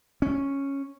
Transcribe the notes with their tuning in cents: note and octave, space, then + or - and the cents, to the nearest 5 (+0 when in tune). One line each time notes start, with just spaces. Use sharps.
C#4 -5